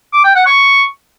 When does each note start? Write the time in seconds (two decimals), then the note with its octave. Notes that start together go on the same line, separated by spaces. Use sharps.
0.13 D6
0.24 G5
0.35 F#5
0.46 C#6